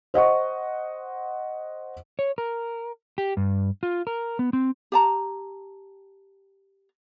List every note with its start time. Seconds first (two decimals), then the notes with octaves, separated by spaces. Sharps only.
0.14 C5 D#5 F#5 C#6
2.19 C#5
2.38 A#4
3.18 G4
3.37 G2
3.83 F4
4.07 A#4
4.39 B3
4.53 C4
4.92 G4 A5 A#5